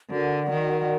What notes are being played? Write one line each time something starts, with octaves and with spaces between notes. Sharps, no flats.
D3 F#4 A#4 D5 F#5
D#3